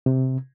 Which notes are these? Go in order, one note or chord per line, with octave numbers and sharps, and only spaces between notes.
C3